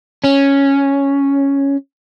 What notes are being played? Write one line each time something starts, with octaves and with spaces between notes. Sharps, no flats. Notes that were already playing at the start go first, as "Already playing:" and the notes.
C#4